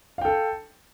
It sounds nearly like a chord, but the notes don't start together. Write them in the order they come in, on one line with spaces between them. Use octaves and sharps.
F5 G5 A4